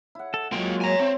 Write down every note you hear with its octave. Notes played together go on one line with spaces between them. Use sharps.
E4 F#5
A4
F#3 G#3 A#3 F4 G5
C#5 G#5 A#5
C4 E4